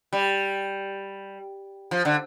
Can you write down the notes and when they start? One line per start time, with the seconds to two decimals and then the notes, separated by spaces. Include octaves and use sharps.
0.13 G3
1.91 F3
2.05 D3